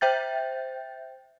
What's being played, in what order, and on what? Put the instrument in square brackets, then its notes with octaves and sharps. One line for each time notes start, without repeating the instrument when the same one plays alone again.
[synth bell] C5 E5 G5 G6 A6